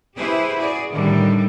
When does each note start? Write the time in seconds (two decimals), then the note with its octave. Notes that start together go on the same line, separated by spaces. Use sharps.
0.17 E4 G4 G#4 B4 C5
0.56 F#4 G#4 D5
0.92 A2 D3 D#3 G3 D4